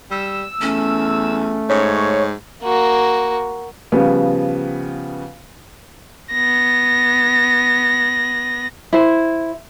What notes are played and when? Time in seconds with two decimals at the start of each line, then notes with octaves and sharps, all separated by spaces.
0.11 G3 E6
0.61 E2 A3 C#4
1.69 G#2 C#5
2.63 A#3 F#4
3.92 C#3 F3 G3 B3
6.31 B3 A#6
8.93 E4 C5